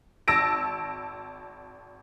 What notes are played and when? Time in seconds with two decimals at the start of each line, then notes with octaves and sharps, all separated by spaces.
0.28 G#1 A5 E6 A#6 D7